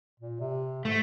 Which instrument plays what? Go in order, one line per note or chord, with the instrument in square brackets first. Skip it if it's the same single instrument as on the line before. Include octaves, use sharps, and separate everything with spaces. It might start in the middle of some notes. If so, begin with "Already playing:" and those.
[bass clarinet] A#2
C3
[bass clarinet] G#2 [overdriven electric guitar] A3